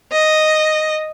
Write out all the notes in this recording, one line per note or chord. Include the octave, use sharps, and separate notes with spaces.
D#5